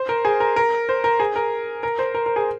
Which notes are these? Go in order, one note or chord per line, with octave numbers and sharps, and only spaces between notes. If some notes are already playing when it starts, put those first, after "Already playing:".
Already playing: C5
A#4
G#4
A#4
A#4
C5
A#4
G#4
A#4
A#4
C5
A#4
A#4
G#4